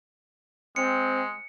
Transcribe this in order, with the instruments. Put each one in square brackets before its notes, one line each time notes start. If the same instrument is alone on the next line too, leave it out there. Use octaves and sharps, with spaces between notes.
[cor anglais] G#3 [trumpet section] C4 [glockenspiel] C#7